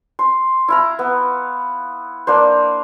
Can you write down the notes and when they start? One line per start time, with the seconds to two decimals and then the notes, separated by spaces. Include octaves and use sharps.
0.19 C6
0.68 E4 F5 A#5
0.99 B3
2.27 A#3 D4 C5